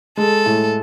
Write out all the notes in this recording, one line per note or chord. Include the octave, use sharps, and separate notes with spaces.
G#3 A4
A2